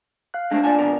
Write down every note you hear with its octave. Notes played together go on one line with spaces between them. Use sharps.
F5 F#6
G#3 A3 C4 D4
A#2 D5 G#5 A5
F2 B2 A#4